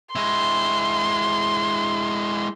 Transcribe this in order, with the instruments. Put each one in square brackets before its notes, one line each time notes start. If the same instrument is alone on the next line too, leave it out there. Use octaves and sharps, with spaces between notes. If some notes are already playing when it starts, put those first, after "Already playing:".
[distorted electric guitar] G#3 E4 [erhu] C6